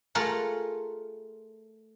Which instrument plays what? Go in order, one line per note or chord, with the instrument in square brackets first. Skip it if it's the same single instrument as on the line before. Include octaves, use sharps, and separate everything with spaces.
[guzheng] A3 F4 G#4 A#4 F#5